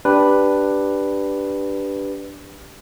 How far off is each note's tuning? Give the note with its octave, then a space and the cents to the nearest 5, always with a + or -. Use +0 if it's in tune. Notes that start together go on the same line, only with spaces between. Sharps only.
D4 +0 G4 +0 B4 +0